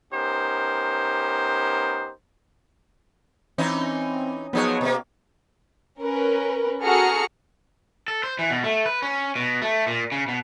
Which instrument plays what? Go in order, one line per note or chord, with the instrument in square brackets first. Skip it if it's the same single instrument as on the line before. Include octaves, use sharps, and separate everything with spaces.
[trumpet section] B3 C#4 D#4 G4 A#4 C5
[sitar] E3 C#4 D#4 [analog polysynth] C4
[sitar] F3 F#3 G#4 [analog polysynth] B3 D#4 C#5
[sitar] B2 A#3
[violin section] C#4 A#4 B4
F#4 G#4 A4 A#5 F6 C#7
[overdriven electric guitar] A4
C5
E3
B2
A3
B4
C#4
B2
A3
A#2
C#3
B2